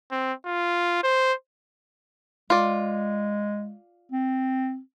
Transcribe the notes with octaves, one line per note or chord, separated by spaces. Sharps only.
C4
F4
C5
G#3 F4 D5
C4